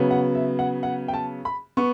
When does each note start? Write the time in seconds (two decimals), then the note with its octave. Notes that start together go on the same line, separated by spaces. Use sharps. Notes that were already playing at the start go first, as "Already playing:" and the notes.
Already playing: C#3 F#3 B3
0.11 F#5
0.35 E5
0.59 F#5
0.83 F#5
1.08 G5
1.14 A5
1.45 B5
1.77 B3 C#6